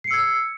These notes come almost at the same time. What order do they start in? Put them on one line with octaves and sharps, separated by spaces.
C7 C#7 E6 G#6